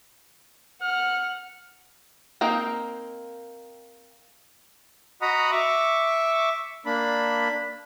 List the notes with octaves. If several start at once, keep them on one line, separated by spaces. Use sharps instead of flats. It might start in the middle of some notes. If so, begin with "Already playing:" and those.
F#5 F6
A#3 C4 D#4 A#4
F#4 D#5 F#5 A#5 B5 D#6
E5 C#6 D6
A#3 D4 B5